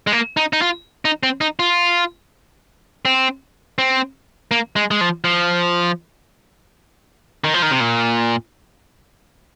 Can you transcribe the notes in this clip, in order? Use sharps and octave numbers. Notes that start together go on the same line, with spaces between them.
G#3
A#3
D#4
D#4
F4
D#4
C4
D#4
F4
C4
C4
A#3
G#3
G#3
F3
F3
D#3
F3
D#3
C3
A#2